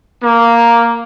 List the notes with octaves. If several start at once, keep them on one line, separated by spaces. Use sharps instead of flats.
A#3